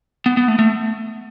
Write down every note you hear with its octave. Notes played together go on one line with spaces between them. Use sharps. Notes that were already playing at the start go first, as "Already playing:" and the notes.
B3
B3
A3
A3